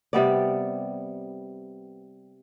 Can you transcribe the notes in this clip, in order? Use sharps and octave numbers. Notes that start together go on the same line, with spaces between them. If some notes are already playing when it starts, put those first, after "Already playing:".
C3 G3 B3 D5